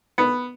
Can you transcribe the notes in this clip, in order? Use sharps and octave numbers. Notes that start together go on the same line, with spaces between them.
B3